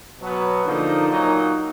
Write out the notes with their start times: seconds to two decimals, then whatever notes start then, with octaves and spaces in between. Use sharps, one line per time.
0.20 B2 F#3 B3
0.64 D3 F3 A#3 D#4
1.08 A#2 F#3 A#3 D#4